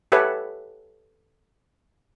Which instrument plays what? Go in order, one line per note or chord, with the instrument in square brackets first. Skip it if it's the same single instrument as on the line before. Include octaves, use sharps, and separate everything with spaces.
[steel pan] G4 A4 B4 C#5 E5 F#5